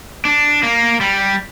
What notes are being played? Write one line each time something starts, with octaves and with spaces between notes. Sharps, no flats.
D4
A#3
G3